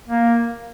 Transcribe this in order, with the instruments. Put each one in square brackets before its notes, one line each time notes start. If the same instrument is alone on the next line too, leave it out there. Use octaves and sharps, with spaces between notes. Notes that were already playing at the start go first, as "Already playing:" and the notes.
[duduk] A#3